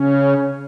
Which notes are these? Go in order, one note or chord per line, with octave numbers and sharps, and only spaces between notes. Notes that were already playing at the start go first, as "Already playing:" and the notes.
Already playing: C#3 C#4